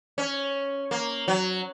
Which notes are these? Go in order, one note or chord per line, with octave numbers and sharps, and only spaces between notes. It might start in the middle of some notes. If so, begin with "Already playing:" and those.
C#4
A#3
F#3